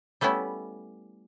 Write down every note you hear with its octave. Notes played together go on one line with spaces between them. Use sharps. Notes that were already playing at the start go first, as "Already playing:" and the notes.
G3 A3 B3 C#4 E4